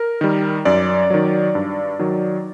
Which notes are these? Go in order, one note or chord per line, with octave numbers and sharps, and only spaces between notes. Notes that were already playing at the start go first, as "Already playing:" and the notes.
Already playing: A#4
D#3 G3
F#2 D5
D#3 F#3
G2
D#3 F#3